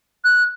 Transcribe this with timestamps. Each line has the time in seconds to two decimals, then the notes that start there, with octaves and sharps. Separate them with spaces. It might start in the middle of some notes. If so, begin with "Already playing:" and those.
0.25 F#6